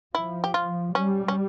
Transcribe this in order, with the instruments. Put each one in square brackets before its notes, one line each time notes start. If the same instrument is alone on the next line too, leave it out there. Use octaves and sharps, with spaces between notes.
[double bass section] F3 [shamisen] E4
[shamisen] G4
F4
[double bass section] G3 [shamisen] C#4
[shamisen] C#4